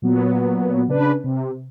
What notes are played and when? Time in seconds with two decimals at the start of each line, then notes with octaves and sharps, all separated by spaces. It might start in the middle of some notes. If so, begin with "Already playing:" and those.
0.02 A#2 F#3 B3
0.88 C#3 D4 B4
1.24 C3